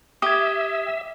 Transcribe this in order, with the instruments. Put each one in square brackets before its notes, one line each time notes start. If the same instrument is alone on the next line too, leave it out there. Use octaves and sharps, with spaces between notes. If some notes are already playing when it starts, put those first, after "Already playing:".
[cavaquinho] G4 [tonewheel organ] E5 [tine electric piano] D#6 G#6